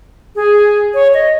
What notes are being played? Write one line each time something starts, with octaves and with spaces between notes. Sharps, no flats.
G#4
C#5
D#5